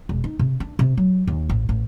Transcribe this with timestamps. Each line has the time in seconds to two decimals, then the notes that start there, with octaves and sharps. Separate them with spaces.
0.09 E1
0.24 D#4
0.39 C3
0.60 D4
0.79 C3
0.97 F#3
1.27 D#2
1.49 A1
1.69 A1